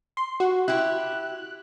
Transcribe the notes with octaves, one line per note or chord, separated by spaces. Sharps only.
C6
F#4
E4 G4 F#6